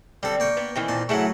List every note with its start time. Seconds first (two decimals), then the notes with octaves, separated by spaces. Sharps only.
0.23 D3 G3 C4 A4
0.40 A#3 G5 C#6
0.57 B3
0.76 D#3 E3 C4
0.88 A#2 A5
1.09 C#3 F#3 A3 E4 F#5